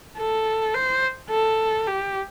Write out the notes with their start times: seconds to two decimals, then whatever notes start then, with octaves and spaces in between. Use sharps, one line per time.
0.17 A4
0.74 C5
1.29 A4
1.86 G4